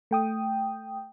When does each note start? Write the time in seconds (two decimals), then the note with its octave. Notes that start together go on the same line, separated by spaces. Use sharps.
0.11 A3 G5 D#6